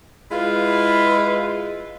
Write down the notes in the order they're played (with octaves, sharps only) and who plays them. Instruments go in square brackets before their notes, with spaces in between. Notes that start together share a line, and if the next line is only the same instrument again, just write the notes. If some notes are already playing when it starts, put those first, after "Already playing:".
[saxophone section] G#3 E4 F4 B4